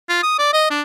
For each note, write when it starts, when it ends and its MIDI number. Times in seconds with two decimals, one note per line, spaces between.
0.09 0.21 65
0.23 0.35 87
0.39 0.50 74
0.53 0.66 75
0.70 0.82 62